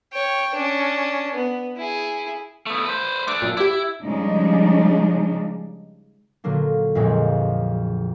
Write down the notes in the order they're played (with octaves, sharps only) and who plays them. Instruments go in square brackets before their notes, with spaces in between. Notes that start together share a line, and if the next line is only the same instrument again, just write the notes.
[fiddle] C#5 G5
C#4 D4
B3
E4 G#4
[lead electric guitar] A3 B3
B4 C5
[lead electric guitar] A3 D4 [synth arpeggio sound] D6
[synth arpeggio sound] F#2 A#2
[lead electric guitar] E4 [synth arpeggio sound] G4 D6
[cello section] C#3 F3 G3 G#3 D4 D#4
[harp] A#2 D3 F#3 A#3 D4
A#1 F2 A#2 F#3 G#3